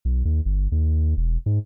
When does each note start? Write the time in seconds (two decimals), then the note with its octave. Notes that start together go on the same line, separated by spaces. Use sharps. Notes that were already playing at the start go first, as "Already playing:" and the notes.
0.05 B1
0.25 D#2
0.45 G1
0.72 D#2
1.17 E1
1.46 G#2